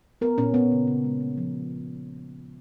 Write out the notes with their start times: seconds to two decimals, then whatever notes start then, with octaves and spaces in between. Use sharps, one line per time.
0.21 B3 A#4
0.38 A#2 C#4
0.54 A#2 B3
0.72 C#3
0.87 C#3
1.04 G#3
1.21 A#3
1.38 F3